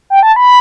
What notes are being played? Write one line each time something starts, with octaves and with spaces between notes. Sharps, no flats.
G5
A5
B5